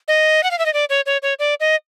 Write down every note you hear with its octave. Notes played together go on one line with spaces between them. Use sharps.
D#5
F#5
F5
E5
D#5
D5
C#5
C#5
C#5
D5
D#5